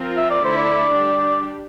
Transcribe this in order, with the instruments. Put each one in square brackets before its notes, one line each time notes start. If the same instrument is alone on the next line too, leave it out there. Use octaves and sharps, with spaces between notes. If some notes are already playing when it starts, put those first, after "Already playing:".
Already playing: [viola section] F3 C4 F4 A#4
[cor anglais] E5
D5
[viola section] D3 A3 E4 A4 [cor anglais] C5
[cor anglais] D5
[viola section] G3 D4 G4